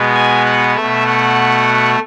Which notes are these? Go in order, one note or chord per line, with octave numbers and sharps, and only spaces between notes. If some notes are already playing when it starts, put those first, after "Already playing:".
Already playing: B2 G#3 B3
G#5
F#5
B2 A3 E5
F#5